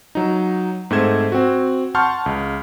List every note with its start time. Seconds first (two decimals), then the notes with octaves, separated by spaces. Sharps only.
0.15 F#3 D#4
0.90 G#2 A3 C4 C5 G#6 E7
1.32 C4 F#4
1.95 F#5 A5 C6 C#6 F6 G6
2.26 C#2